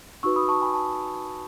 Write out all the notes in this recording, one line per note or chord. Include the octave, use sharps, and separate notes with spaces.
D#4 F#4 B4 C#6 E6
B5 D#6
A5 C#6
G#5 B5
A5 C#6